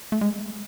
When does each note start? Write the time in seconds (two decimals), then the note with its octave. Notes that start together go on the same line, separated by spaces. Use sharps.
0.12 A3
0.21 G#3